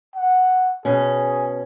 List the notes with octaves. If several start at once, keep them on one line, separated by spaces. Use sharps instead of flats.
F#5
B2 C#4 G#4